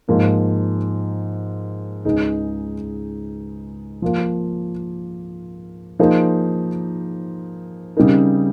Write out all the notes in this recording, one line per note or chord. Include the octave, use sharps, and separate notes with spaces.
G#2 F3 A#3 D#4
C#2 C#3 G#3 D#4
F3 A#3 F4
F3 A#3 D#4 G#4 C5
C#3 G3 C4 D#4 A#4